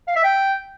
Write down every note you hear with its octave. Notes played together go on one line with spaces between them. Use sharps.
F5
E5
G5